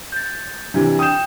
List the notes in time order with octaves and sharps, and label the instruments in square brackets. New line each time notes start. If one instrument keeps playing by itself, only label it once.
[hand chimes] G6 A6
[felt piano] C3 E3 [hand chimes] D4
[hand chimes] G5 G6 [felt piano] D#6 E7